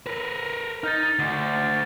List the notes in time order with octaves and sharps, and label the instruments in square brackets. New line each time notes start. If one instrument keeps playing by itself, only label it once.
[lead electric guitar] A#4 B4
[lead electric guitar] D#4 [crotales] F6 G6 A6
[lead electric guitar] D2